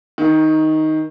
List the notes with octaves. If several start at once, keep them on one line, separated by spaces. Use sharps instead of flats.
D#3